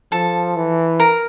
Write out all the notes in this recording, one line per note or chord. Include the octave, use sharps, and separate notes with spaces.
F3 A4
E3
A#4